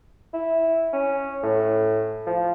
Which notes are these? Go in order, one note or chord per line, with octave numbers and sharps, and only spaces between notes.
E4
C#4
A2
F3